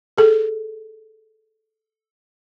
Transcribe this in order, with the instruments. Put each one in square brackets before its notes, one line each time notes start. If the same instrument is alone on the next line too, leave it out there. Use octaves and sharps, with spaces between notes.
[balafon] G#4 A4